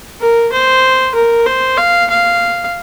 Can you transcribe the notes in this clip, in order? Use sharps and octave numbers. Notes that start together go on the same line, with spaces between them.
A#4
C5
A#4
C5
F5
F5